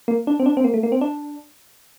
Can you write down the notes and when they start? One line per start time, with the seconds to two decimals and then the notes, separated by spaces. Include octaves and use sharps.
0.08 A#3
0.27 D4
0.40 C4
0.46 D4
0.57 C4
0.64 A#3
0.74 A3
0.83 A#3
0.92 C4
1.01 D4